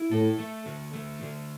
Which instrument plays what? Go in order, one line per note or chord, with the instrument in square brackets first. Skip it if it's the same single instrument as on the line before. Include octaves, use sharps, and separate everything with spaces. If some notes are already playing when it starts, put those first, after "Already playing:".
Already playing: [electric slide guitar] E4
[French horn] A2 [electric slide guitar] A4
[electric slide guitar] A3
D3
A3
D3